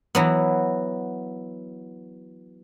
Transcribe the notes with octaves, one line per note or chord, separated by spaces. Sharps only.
E3 F#3 B3